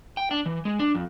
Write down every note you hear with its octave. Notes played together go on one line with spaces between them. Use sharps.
G5
D4
E3
G#3
D4
F2